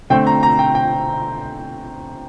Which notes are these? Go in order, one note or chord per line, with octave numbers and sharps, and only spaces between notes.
D3 A3 C4 G5
A#5
A#5
G5
G5